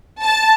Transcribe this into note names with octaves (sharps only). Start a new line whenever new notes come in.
A5